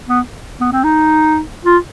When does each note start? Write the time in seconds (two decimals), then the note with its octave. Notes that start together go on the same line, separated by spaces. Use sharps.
0.09 B3
0.61 B3
0.72 C4
0.84 D#4
1.65 F4